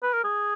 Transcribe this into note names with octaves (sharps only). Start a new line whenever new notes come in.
B4
A#4
G#4